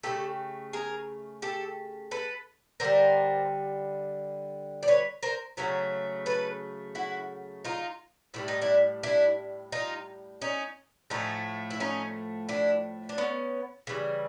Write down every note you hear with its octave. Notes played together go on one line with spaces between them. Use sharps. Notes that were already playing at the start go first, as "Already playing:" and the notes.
C#3 F#3 A3 G4 A4
G#4 A#4
G4 A4
A4 B4
D3 G3 A#4 C5
D5
B4 C#5
A#4 C5
C#3 F#3 A3 C#5
A4 B4
E4 F#4
D#4 F4
A2 E3 G3 E4
D#4
D4 E4
D4 E4
D#4 F4
C#4 D#4
A2 F3 A3 C#4 D#4
E4
C#4 D#4
D4 E4
D4
B3 C#4
C#3 E3 G3